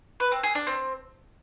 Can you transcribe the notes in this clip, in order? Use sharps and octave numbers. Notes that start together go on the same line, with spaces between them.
B4
C4
G#4
D4
C4